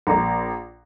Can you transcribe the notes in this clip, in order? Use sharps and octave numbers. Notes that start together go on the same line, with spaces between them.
A#1 A#5